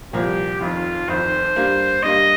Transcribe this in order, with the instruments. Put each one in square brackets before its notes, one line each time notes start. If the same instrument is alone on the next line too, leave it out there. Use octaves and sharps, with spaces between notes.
[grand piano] C2 A#2 F3 A#3 [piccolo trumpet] G4
[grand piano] F1 F2 D#3 [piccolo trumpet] F4
[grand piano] F1 F2 D#3 [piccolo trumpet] C5
[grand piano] G2 G3 A#3
[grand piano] G2 G3 A#3 [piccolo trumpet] D#5